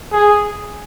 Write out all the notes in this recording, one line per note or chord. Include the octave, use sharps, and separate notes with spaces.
G#4